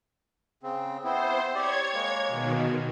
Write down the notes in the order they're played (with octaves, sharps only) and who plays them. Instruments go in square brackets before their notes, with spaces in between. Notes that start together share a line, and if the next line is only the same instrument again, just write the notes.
[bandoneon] C#3 C4
[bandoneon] B3 C4 E4 [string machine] C5
[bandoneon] G4 D5 [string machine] C#5 G#6
[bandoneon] G#3 A#3
[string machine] B2 D#3